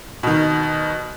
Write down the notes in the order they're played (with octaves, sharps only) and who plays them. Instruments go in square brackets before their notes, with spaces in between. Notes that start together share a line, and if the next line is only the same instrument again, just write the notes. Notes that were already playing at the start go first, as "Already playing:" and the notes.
[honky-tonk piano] B2 D#3